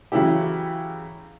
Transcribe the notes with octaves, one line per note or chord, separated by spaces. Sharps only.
C#3 E3 F#3 E4 G4